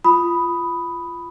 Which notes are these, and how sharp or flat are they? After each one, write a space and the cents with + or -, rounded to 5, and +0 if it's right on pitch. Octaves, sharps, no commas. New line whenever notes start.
F4 -15 B5 +0 D#6 +0